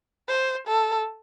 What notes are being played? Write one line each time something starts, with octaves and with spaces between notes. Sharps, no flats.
C5
A4